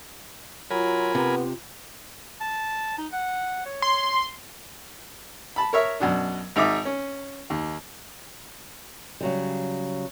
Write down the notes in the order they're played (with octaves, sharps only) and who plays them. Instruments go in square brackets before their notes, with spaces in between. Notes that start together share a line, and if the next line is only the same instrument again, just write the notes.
[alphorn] F#3 [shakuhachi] F4 [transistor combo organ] A#4 G#5 B5
[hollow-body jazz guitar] C3 [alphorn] B3
[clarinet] A5
D#4
F#5
C#5
[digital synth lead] C6
[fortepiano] A5 B5
A#4 C#5 E5
F#2 B2 D4
G#1 D#4 E5 D6
C#4
D#2
[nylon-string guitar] C#3 F#3 G3